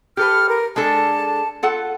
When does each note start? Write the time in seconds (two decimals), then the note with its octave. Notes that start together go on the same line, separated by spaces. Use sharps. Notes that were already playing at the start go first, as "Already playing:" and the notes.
0.17 G4 A4 B4 F6
0.49 A#4
0.76 G#3 D4 A4 A5
1.63 F4 A4 F#5